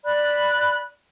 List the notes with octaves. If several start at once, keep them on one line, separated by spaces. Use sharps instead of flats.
D5 B5 F#6